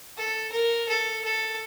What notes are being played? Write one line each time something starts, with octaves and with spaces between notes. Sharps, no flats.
A4
A#4
A4
A4